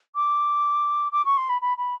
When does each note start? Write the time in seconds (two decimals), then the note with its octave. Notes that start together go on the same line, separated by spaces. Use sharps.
0.15 D6
1.12 D6
1.25 C#6
1.37 C6
1.49 B5
1.61 B5
1.78 B5